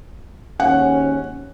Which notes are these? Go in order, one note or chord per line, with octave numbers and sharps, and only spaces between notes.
G#1 D#2 C#4 F#5